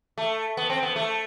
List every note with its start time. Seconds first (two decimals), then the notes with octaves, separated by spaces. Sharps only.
0.18 A3
0.57 B3
0.70 C4
0.83 B3
0.96 A3